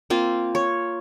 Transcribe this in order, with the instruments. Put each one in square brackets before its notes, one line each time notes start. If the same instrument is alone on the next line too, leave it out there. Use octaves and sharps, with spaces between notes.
[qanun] A#3 C4 F4
C#5